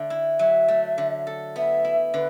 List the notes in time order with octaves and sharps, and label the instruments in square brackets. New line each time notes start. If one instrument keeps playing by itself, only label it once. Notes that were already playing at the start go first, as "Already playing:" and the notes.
Already playing: [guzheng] D3 A3
E4
[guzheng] F#3 [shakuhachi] E5
[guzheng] A3
D3
A4
[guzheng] B3 [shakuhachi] E5
[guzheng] E4
[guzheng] D3 [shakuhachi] B4